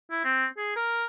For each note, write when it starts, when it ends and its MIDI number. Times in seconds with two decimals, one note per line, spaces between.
0.11 0.23 64
0.25 0.46 60
0.58 0.75 68
0.76 1.06 70